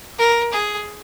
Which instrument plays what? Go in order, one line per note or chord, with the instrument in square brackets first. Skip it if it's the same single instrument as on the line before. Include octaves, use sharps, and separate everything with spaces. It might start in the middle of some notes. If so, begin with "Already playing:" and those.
[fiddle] A#4
G#4